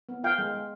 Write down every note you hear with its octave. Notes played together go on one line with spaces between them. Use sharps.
B3
F4 F5 G5
G#3
G#3